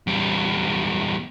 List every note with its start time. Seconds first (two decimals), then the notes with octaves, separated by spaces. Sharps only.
0.07 E2 G3